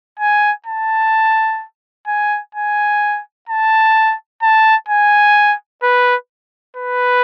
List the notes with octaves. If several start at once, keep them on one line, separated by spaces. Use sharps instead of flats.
G#5
A5
G#5
G#5
A5
A5
G#5
B4
B4